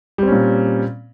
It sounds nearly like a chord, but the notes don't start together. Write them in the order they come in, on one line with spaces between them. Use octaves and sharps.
G3 C4 C#4 A#2